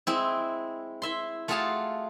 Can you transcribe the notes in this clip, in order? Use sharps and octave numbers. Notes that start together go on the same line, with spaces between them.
G#3 C4 E4
E4 E5 C6
A3 F4 F#4 G#4 F5 A5